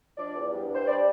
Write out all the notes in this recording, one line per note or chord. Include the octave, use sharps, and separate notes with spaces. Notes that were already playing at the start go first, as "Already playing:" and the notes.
F3 D4 D5
E2
G2
G2
C5
G3 D4 D5